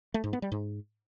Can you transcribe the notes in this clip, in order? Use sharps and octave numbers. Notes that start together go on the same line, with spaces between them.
A3
G#2
B3
G3
G#2